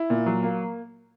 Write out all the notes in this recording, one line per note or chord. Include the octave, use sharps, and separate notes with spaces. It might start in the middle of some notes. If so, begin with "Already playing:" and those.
Already playing: E4
A#2
F#3
A#3